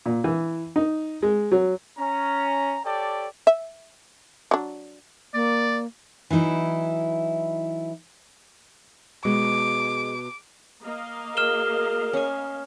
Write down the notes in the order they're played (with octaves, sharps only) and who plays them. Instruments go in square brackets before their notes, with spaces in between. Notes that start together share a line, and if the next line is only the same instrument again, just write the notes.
[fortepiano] A#2
E3
D#4
G#3
F#3
[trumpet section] C#4 A#5
G4 A4 C#5 D5 G5 A5
[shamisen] E5
F#3 D4
[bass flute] A#3 [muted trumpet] D5
[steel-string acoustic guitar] E3 F#3 D#4 E4
[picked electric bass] B2 [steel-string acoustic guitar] G#3 [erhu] D6
[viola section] A#3 D#5 F5
[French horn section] F#4 G#4 A#4 [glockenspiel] F6 E7 G7
[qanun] C#4 G#5